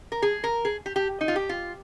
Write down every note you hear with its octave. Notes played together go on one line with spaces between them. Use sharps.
A#4
G#4
A#4
G#4
G4
G4
D#4
F4
G4
F4